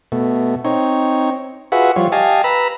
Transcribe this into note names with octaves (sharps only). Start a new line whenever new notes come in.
B2 A3
C4 D#4 C#5
F4 F#4 G#4 B4 E5 F#5
F3 G3 F4 C#5
G4 D#5 F5 G#5 A5
B4 A#5 B5 E6